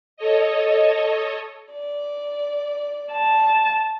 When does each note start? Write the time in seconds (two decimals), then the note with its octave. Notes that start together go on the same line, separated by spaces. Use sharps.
0.17 A4 C#5 D#5
1.71 D5
3.12 A5